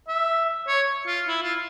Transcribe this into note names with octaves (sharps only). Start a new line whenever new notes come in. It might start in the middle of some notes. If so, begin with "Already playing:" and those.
E5
C#5
F4
E4
F4